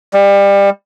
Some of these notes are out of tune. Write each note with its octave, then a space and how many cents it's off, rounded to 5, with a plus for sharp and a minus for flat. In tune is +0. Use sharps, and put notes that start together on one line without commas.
G3 +25